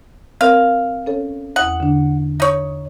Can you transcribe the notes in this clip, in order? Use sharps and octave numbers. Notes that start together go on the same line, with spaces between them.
C4 A#4 C#5 F5
C#4 A4 C#5
E2 F#5 D#6
D3 D4
D#4 C#5